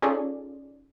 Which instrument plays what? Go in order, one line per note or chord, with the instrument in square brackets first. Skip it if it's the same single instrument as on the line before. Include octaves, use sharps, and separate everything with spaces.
[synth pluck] C#4 D#4 F4 G#4 A4 D5